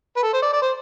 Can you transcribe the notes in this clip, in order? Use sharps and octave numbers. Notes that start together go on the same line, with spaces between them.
B4
A4
C5
D5
D5
C5